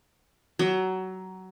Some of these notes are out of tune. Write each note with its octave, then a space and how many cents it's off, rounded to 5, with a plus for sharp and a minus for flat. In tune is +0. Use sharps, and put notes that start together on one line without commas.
F#3 +20